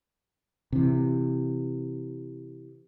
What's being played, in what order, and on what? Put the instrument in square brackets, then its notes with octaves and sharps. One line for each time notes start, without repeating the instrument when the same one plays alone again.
[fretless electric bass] C3 E3